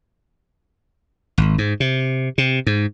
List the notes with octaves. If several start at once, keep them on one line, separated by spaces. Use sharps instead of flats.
G#1
G#2
C3
C3
G#2